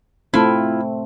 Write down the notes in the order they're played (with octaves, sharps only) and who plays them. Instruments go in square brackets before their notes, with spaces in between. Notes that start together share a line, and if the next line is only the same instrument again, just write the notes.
[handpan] A3 C4 [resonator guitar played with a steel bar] E4 F4